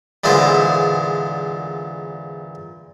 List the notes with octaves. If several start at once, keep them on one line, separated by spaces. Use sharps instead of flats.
E2 A#2 D3 G#3 C5